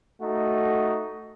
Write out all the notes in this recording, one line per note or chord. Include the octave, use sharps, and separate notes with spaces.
A3 D#4 F#4